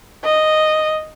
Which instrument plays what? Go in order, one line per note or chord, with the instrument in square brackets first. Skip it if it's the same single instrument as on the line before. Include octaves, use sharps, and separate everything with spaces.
[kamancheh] D#5